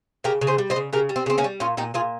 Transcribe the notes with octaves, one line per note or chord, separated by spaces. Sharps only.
C#3 G4 A#4
C#3
G#4 C5
G3
C5 D#5
C#3
C#3 G4 A#4
G3
C4
C#3 C4
A#3 C#4
G3
A#2 C#4 F4
A#2 D#4 G4
A#2 F4 G#4